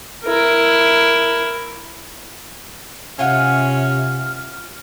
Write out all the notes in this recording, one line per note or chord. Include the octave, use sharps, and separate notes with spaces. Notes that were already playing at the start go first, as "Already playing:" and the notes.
E4 A#4
C3 C#4 F4 E5 F#5 F6